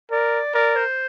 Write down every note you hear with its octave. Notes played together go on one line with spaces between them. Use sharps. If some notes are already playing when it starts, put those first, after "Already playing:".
A#4 D5
A#4 D5
C5